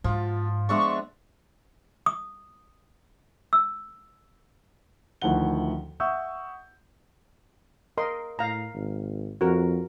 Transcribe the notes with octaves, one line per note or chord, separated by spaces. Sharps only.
G#2 F3 F4 F#4
F3 G#3 B3 D4 E5 C6 C#6
D#6
E6
D2 D#3 F3 E4 F#5 G7
E5 F#5 C#6 D#6 E6 G6
A#4 D#5 C6
A2 F5 A#5
G#1
F2 F#4 A#4